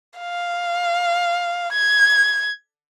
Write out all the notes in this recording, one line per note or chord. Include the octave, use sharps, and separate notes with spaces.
F5
G#6